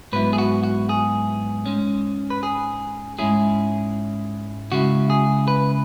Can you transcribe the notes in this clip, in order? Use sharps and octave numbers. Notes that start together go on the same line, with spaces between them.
G#2 F#3 B3 E4 B4
G#4
F#4
F#4
G#4
G#2 G#3 C#4
B4
G#4
G#2 G#3 C#4 E4 G#4
C#3 G#3 E4 F#4
G#4
B4